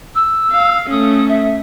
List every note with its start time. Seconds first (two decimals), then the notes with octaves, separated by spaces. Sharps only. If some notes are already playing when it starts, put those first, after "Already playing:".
0.15 E6
0.52 F5
0.90 A3 C#4 D#6
1.28 E5